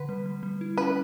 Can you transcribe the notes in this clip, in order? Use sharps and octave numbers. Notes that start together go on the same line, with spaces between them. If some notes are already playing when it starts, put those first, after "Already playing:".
Already playing: D3 B4
G3
G3
G3
E4
C#4 B4